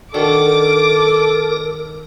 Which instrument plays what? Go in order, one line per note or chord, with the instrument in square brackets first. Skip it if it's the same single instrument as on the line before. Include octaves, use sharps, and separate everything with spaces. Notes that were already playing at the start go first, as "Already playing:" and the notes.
[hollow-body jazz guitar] D#3 D4 F#4 [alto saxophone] A4 [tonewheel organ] A#4 [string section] D6